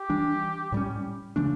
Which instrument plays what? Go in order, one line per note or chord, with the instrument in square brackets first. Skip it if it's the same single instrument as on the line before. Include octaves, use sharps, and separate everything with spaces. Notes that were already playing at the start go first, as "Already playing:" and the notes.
Already playing: [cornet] G4
[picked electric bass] E3 G3 D4
A2 G3 C#4
C#3 E3 A3 D4